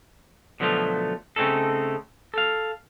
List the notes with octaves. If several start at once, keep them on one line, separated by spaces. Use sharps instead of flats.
B2 D3 F3 F#3 A3 F4
C#3 A3 C4 C#4 D#4 A4
A4 F5